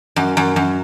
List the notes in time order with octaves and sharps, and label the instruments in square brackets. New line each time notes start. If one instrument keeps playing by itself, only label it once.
[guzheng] F#2
F#2
F#2